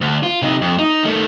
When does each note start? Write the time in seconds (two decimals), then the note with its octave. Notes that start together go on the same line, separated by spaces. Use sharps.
0.01 D2
0.23 F4
0.42 C3 D#4
0.61 F2
0.79 D#4
1.04 D#3 A3